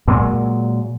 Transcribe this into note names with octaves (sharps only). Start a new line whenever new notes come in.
A#2 F#3 G#3